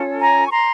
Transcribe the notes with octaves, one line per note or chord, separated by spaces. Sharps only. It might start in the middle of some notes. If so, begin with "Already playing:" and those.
Already playing: C#4 F4 A4 C#5
G#5 A#5
C#6
A#5 C6